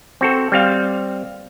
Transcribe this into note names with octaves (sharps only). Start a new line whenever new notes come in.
C4 F#4 A4
G3 C4 F5